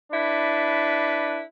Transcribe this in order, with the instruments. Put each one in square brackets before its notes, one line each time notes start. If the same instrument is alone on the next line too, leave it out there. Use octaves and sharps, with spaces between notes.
[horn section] D4 E4 B4